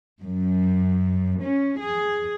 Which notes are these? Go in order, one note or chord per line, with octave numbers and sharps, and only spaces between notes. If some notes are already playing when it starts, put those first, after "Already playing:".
F#2
C#4
G#4